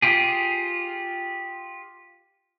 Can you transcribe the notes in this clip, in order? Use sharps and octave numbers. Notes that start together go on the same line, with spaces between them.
F4 G4 G#4